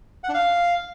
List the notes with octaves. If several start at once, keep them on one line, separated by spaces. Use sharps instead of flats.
F#5
D4
F5